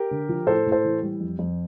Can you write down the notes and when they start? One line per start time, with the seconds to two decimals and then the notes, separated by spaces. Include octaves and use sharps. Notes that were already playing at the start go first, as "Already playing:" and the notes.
Already playing: G4 A#4
0.11 D3
0.29 F3
0.47 A2 A4 C5
0.66 A2
0.72 A4 C5
0.85 E3
1.02 G3
1.20 F2
1.39 F2